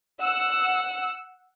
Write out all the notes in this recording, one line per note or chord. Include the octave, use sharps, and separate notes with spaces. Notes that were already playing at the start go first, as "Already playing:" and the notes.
F#5 E6